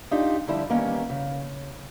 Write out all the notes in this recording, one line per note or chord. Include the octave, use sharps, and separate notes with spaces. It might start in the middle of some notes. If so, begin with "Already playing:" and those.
D4 D#4 F4 G4 F5
D3 F3 G3 D4 E4
D#3 G3 A#3 B3 C#4
C#3